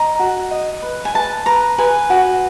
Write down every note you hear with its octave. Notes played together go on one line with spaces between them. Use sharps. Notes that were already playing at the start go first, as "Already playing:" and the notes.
Already playing: D#5 A#5
F#4
D#5
B4
G#5
B4 A5
B4 A#5
B4 G#5
F#4